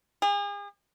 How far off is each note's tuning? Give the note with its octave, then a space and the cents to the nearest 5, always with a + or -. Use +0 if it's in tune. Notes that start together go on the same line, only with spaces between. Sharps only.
G#4 -40